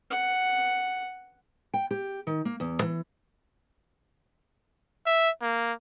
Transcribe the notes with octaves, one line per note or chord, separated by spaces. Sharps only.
F#5
G5
G4
D#3
A#3
E2
E3
E5
A#3